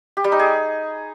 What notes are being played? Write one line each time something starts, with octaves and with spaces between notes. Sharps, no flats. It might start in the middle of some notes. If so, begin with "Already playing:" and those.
G4
G3
D#4
G#4